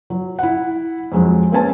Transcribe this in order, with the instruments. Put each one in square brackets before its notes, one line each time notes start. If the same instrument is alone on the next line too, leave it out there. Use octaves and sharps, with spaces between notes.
[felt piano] F#3
E4 F#5
F2 F#3 G#3 C4
A#3 C4 C#4 B4 G#5 A5